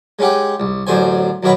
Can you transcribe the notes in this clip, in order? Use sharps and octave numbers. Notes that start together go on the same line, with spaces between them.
G#3 C#4 D#4 G4 F#5
C2
A1 F#2 D3 C5 G#5
F#2 B2 D#3 C#5 F#5 B5